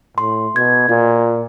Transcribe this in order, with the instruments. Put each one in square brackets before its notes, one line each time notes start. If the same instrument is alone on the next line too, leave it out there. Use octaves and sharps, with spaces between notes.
[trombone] A2 [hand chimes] C6
[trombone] B2 [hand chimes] G#6
[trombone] A#2 [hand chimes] F4